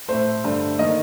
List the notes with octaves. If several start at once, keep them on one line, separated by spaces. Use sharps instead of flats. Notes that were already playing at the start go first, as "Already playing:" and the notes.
A2 A3 C5
G2 D3 A3
D#3 A#3 D#5